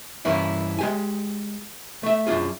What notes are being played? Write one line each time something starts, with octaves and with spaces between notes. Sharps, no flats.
G2 E3 A#3 C#4 E4
G#3 G4 G#5
A3 E5
F#2 D4 F4 G#4